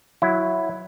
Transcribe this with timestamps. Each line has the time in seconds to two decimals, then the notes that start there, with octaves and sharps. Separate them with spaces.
0.22 F#3 E4